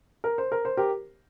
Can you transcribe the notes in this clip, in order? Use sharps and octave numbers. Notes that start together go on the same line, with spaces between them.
A#4
C5
A#4
C5
G4 A#4